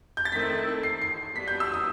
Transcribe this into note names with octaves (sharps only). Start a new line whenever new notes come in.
G6
A6
D#3 A3 C4 E4 A4 B6
C7
C7
G3 B3 F#4 B6
G6
E6
D#6